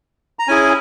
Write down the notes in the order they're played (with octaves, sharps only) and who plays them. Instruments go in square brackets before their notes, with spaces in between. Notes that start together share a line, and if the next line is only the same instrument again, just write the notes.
[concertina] A#5
C#4 E4 G#4 G#5